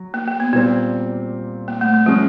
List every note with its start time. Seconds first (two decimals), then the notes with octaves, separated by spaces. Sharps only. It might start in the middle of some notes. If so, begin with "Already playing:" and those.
Already playing: F#3
0.14 A#3
0.28 A#3
0.40 B3
0.53 A#2 G3 B3 C4
1.68 A#3
1.81 A3
1.94 A3
2.06 F3 G3 G#3 C#4